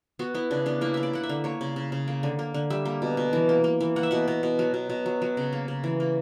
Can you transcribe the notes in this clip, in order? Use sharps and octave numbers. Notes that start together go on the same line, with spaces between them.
B3 F#4
B3 E4
C#3 D4
B3 D4
A#3 E4
A#3 E5
D5
A#3 F#5
E5
D3
A#3 C#5
C#3
C#3
C#3
A#3
D3
A#3
D3
G3 E5
A#3
B2
B2
E3
A#3
A#3
E3
A#3 F#5
E5
B2 F#5
B2
B2
F#3
B2
B2
F#3
F#3
C#3
A#3
C#3
E3
A#3